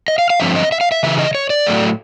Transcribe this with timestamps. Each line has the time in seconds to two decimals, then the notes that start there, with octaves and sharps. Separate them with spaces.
0.08 D#5
0.19 F5
0.30 F5
0.40 G2 D3 F3 C4 E5
0.56 D#5
0.72 E5
0.81 F5
0.92 E5
1.03 C#3 E3 E5
1.18 D#5
1.35 C#5
1.50 D5
1.67 A2 F#3 A3